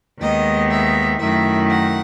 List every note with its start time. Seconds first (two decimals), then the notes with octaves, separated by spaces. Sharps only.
0.20 D#2 D#3 G#3 B3 D#5
0.70 E5
1.19 F#2 D#3 A3 E4 E5
1.69 F#5